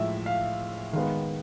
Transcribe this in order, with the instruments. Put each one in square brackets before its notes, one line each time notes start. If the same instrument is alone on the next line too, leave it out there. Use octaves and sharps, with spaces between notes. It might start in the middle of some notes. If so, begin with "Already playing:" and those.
Already playing: [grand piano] A2 F3 G#3 E5
F5
D#3 G#3 B3 F5